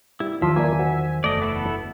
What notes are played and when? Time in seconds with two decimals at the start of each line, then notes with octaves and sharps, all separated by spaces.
0.20 G3 E4
0.42 E2 D#3 F3 F#3 F4 E5
0.56 A#3 A#4 D5 G#5
0.79 F#4 C5
1.24 F#1 E2 A3 D5 D#5
1.42 B3 E4 A4